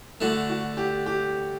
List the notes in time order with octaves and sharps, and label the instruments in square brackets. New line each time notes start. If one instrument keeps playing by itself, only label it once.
[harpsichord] D3 A3 D4 [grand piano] F#4
[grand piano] F#4
G4
G4